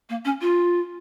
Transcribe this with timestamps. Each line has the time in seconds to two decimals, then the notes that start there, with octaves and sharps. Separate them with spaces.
0.09 A#3
0.25 C#4
0.41 F4